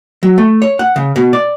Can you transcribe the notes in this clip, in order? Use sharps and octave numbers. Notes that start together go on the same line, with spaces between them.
F#3
A3
C#5
F#5
C#3
B2
D5